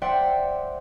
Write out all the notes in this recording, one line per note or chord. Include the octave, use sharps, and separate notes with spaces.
C5 D5 E5 F#5 G5 C6